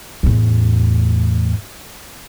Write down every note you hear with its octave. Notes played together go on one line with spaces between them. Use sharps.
E2 A2